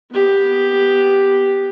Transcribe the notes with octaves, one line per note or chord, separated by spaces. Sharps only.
B3 G4